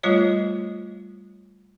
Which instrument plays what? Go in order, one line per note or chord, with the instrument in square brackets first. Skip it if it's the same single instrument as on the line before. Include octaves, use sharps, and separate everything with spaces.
[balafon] G3 A3 F4 C5 C#5 D#5